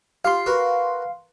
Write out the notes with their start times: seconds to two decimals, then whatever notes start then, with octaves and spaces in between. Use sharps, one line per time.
0.25 F4 G4 F5 C6
0.46 F#4 A#4 B4